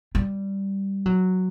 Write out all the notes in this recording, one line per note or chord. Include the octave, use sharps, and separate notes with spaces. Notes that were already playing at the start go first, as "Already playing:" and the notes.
G3
F#3